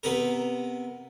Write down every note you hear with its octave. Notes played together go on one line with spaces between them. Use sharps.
C3 B3 A#4